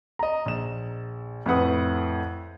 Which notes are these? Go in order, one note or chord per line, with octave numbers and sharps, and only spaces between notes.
D#5 A#5
A#1 E7
F2 A2 B4 F#5 D#6